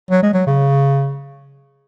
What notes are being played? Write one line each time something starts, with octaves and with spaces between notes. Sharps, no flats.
F#3
G#3
F#3
C#3